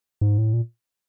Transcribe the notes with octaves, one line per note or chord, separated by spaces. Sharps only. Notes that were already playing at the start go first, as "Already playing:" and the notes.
G#2
A2
A#2